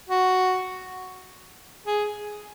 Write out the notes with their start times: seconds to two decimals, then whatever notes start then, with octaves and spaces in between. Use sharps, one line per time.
0.09 F#4
1.87 G#4